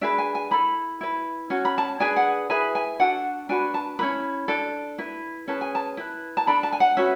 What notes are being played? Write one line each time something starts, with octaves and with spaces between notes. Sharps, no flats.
D4 G#4 B4 E5
G#5
G#5
E4 A4 B5
E4 B4
C#4 F#4
B5
A5
D4 G#4 B4 G#5
F#5
E4 G#4 B4 G#5
G#5
D4 F#4 A4 F#5
D4 F#4 B4 G#5
A5
C#4 E4 B4 B5
D4 A4
E4 B4
C#4 G#4 B4 A5
G#5
A5
E4 B4
A5
D4 A4 B5
A5
G#5
F#5
C#4 F#4 B4 E5